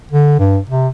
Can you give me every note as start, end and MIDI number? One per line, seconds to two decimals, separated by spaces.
0.12 0.36 50
0.39 0.59 43
0.69 0.88 48